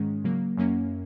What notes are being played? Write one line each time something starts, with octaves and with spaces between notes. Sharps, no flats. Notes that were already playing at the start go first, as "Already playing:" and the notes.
Already playing: G#2 D#3 G#3 C#4
C#3 F#3 A#3
F#2 F#3 A#3 C#4